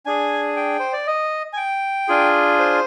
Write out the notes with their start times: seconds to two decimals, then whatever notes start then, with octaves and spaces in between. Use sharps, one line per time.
0.06 D4 G#4 G#5
0.56 G5
0.79 C5
0.93 D5
1.07 D#5
1.53 G#5
1.57 G5
2.08 D4 F4 G#4
2.59 C5